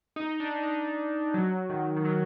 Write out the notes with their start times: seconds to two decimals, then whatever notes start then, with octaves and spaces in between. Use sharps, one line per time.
0.16 D#4
0.40 D4
0.63 D#4
1.34 F#3
1.70 D#3
1.96 D#3
2.05 F#3